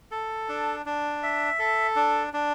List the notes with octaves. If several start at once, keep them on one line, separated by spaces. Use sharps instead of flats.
A4
D4
D4
E5
A4
D4
D4